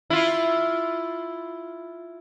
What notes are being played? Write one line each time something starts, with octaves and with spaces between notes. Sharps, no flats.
E4 F4